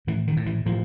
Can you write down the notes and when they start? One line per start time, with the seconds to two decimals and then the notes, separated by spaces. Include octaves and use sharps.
0.07 A2 E3
0.27 D#3
0.37 A2
0.46 E3
0.66 A2 F3